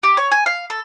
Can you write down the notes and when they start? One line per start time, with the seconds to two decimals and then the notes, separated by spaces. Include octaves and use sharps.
0.03 G4
0.17 C#5
0.32 G#5
0.46 F5
0.70 A4